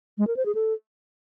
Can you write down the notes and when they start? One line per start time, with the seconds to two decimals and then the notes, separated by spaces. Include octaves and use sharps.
0.18 G#3
0.27 A#4
0.37 C5
0.46 G#4
0.55 A4